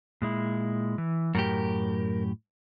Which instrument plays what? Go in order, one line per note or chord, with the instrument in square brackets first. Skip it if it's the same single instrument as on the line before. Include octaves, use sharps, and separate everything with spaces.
[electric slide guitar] A#2 G#3 E4
E3
[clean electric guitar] F#2 A2 G4 [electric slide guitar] A#4